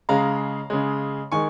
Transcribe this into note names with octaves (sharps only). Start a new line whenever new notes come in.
C#3 G#3 F5 A#5
C#3 G#3
D#3 G#3 G#5 C#6